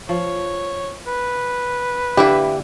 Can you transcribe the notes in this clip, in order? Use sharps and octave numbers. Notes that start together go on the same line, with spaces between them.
F3 C#5
B4
D3 E3 A#3 E4 G4 E5